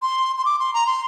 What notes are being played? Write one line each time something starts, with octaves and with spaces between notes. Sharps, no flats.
C6
C6
D6
C6
A#5
C6